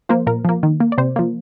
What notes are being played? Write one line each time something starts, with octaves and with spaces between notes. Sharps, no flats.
F3 A#3 C5
A#2 A#4
F3 A#3
D#3
A#3
D5
C3 C5
F3 A#3